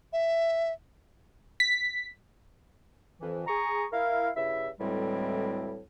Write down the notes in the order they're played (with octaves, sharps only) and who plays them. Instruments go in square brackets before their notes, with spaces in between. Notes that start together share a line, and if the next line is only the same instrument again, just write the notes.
[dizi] E5
[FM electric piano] B6
[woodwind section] F2 E3
G#4 A#5 C#6
E4 A#4 F5
G2 C#3 E4 E5
D2 A2 E3 G3 G#3 C4